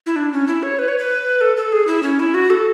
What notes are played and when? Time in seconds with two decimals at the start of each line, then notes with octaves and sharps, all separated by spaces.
0.06 E4
0.16 D4
0.32 C#4
0.47 E4
0.63 C#5
0.79 B4
0.88 C#5
0.98 B4
1.41 A4
1.57 A4
1.72 G#4
1.87 E4
2.03 C#4
2.20 E4
2.34 F#4
2.50 A4